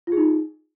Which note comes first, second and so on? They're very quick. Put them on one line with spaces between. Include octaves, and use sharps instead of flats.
F4 G#4 D#4